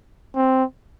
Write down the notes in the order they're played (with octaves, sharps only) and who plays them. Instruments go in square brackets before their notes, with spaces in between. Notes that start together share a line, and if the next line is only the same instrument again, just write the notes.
[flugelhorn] C4